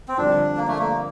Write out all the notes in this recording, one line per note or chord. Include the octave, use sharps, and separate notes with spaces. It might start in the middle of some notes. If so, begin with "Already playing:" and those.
C4
F2 D3 G3 D4
A#3
A3
A#3